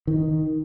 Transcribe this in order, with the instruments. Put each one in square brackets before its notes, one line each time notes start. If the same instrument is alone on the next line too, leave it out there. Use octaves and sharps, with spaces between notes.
[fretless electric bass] D#3